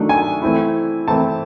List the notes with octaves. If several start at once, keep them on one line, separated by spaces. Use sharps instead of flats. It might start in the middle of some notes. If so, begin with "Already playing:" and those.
Already playing: D#3 F#3 A3 D4
G#5
E3 A3 C4 E4
E3 A3 C4 E4 A5